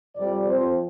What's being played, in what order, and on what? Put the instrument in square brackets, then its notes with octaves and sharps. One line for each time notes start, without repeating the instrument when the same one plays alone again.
[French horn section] F2 C3 G3 D5
F2 F3 C4 C5